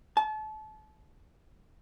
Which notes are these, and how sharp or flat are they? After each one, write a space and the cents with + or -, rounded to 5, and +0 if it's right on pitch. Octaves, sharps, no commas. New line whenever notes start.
A5 -30